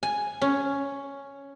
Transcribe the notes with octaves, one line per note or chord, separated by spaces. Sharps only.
G#5
C#4